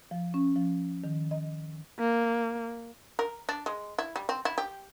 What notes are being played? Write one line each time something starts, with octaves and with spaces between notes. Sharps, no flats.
F3
C#4
F3
D#3
D#5
A#3
A#4
D4
G#3
E4
G3
C4
E4
G4